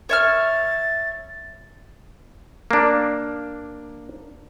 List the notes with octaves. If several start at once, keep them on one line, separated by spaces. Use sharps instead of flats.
C#5 E5 F6 A6
A#3 D4